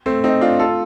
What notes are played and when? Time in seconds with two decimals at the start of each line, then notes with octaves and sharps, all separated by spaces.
0.06 A3 C4
0.24 C4 D#4
0.41 D4 F4
0.59 F4 A4